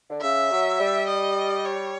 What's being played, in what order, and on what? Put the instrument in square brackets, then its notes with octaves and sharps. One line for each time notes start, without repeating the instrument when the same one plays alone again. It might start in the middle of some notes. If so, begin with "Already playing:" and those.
[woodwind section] D3
[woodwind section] C#3 [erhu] E5
[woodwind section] F#3
G3
[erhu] D#5
C#5